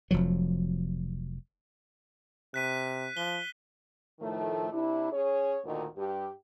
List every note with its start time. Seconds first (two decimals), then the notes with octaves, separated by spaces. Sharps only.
0.11 F1 F3 F#3
2.54 C3 F#6 B6 D#7
3.17 F3 G7
4.20 A2 D#3 F3 A3
4.71 C3 D4 E4
5.12 C#4 G#4 C#5
5.64 D2 A#2 D#3
5.96 G2 G4